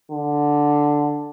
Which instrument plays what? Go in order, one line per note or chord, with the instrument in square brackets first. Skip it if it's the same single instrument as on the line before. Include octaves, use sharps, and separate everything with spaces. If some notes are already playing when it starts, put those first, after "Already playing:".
[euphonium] D3